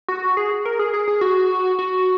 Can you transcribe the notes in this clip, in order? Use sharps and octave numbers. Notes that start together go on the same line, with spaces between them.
F#4
G#4
A#4
G#4
G#4
G#4
F#4
F#4